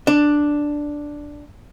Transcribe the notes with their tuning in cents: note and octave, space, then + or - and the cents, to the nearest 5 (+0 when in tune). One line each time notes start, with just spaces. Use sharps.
D4 +0